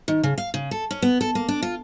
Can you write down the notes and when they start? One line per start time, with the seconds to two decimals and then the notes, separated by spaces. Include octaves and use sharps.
0.08 D#3
0.23 C#3
0.38 F5
0.54 C#3
0.71 A4
0.91 C#4
1.02 B3
1.21 A4
1.35 A#3
1.48 D4
1.62 F4